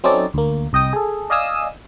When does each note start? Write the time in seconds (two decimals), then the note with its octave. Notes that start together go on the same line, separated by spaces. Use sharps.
0.04 F#3 C4 C#4 D#4 A4 D5
0.34 D2 A#3
0.73 C2 D#5 G5 D#6
0.93 G#4 A4
1.30 D5 D#5 F5 G#5 D#6 E6